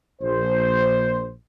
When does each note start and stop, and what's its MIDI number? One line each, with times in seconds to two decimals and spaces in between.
0.22 1.31 34
0.22 1.31 72